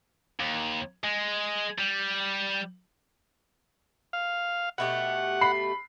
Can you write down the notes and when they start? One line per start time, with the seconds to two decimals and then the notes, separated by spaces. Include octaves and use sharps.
0.40 D#2
1.04 G#3
1.79 G3
4.13 F5
4.78 B2 A3 G4 F#5
5.41 B5 C7